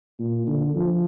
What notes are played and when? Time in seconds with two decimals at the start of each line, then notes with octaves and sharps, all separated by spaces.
0.20 A#2
0.47 D3
0.75 F3